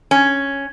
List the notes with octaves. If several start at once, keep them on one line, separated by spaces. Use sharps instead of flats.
C#4